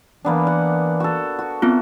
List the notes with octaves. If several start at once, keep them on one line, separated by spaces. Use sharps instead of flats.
E3 A#3 B3 D4
F#5
F#4 A4
F#4
B3 C4 F4